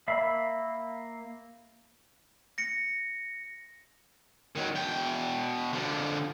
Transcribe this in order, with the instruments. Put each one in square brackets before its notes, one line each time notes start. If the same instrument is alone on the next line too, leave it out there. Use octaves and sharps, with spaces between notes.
[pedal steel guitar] A#3 E5 F5 B5 E6
[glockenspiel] A#6 C#7
[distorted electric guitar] D#3 F#3
B2 G5
D3 F3